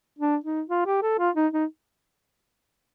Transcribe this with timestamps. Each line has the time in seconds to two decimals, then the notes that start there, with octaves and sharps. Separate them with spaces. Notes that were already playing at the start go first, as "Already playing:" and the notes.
0.19 D4
0.44 D#4
0.70 F4
0.86 G4
1.02 A4
1.19 F4
1.36 D#4
1.53 D#4